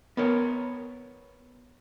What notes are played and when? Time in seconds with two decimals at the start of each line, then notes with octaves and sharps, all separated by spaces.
0.17 B3 A#4 C#5